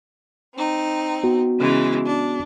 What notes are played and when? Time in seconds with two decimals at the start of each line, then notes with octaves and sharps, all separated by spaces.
0.55 C4 D#4
1.24 B3 F#4
1.60 C#3 E3 G#3
2.06 D4